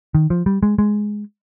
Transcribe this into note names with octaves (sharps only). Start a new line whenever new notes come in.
D#3
F3
G3
G#3
G#3